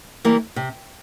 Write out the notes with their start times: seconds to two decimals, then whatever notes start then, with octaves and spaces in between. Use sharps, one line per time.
0.24 E3 G3 A#3
0.56 C3